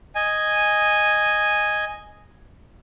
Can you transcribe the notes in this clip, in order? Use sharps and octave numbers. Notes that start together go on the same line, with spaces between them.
D#5 G#5